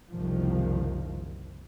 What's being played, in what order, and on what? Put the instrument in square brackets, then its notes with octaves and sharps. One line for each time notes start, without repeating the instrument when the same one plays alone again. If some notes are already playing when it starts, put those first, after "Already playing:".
[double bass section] F#1 C2 D#3 F3